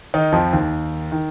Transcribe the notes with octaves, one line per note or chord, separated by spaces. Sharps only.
D#3 D#4
F2 F3
D#2 D#3
D#3